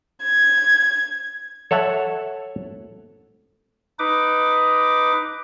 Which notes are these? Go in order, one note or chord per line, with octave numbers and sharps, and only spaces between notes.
G#6
A4 C#5 E5 F#5
D#4 B4 D6